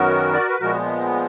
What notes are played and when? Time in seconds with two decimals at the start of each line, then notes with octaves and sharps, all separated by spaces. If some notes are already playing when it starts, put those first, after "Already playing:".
Already playing: F#2 D#3 F#3 B3 F#4 A#4
0.34 D5
0.48 B4
0.60 A#2 F3 G#3 B3 F#4 A#4